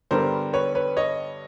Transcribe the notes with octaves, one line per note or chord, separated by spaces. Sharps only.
G2 D3 G3 B3 A#4 C5
B4 C#5
B4 C#5
C#5 D#5